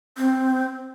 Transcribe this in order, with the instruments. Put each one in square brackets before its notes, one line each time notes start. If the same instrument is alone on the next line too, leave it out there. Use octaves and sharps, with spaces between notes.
[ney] C4